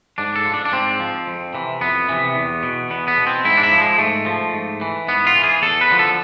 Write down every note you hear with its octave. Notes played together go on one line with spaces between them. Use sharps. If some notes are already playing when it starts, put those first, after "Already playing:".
G#2 D4
A4
F3
D4
D4
G#2 C4
F3
F2
C3 E3
F2 B3
C3 E3
E2
B2
E2 B3
B3
B2
C4
G#2 E4
D4
E4
F3
G#3
G#2 A3
F3
G#2
E3
G#2 B3
F4
E3
G#4
E2 A4
B4
D3 F3
A4